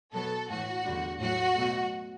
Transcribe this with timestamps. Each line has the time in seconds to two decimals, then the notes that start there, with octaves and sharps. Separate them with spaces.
0.13 B2 F#3 B3 A4
0.48 A2 E3 A3 F#4
0.84 E2 D3 G3
1.19 A2 F#3 A3 F#4
1.55 B2 F#3 A3